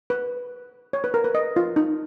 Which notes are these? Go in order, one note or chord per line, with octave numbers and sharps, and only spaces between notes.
B4
C#5
B4
A#4
B4
D#5
F4
D#4